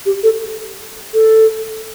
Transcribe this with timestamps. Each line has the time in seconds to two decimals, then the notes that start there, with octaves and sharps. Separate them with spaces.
0.06 G4
0.23 A4
1.14 A4